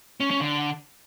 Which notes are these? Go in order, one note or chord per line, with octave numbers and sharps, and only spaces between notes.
C#4
C#4
D3